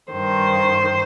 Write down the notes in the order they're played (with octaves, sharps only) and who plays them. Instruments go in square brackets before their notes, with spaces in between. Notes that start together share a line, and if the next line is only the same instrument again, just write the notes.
[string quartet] G2 D#3 C5